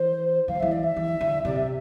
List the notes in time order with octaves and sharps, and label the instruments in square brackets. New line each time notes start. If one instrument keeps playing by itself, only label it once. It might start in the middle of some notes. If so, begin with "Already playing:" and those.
Already playing: [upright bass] E3 [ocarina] C5
[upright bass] E3 [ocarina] F5
[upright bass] F3
[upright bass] E3 [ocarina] E5
[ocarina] D5
E5
[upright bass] E3
D3
[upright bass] C3 [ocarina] D5
[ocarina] E5